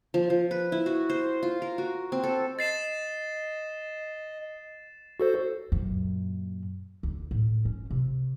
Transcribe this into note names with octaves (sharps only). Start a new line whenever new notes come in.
F3
F3
B4
E4
F#4
C5
F4
A#4
F#4
C4
A4
D#5 A6 C7 E7
F#4 A4 C5
F#2 A#2
D2
A2
C#4
C3